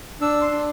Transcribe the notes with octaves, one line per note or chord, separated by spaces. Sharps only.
D4 E6
C6
D4